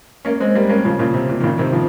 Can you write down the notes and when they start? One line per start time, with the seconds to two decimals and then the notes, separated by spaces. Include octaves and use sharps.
0.25 A#3 C#4
0.40 G#3 C4
0.55 G3 A#3
0.69 A#3 C#4
0.85 C#3 F3
0.99 A#2 C#3
1.14 C3
1.29 A#2
1.40 D#3
1.44 A#2 C#3
1.58 C3 D#3
1.73 C#3 F3